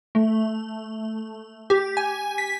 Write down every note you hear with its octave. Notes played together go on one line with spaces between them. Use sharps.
A3
G4
G#5
B6